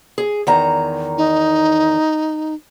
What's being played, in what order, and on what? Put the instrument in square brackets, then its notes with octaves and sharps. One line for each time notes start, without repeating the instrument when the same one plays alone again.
[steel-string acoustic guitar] G#4
E2 D#3 A#5
[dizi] D#4